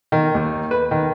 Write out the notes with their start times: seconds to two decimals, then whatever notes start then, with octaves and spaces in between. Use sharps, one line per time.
0.12 D#3
0.35 D#2
0.71 B4
0.91 D#3